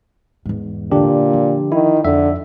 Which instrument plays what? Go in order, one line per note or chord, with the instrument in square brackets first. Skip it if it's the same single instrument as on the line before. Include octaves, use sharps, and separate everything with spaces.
[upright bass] E2 G#2
[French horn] A#2 [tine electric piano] D3 D4 G4
[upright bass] F3
[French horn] D#3 [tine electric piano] E4
[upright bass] F2 [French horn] D3 [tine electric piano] E5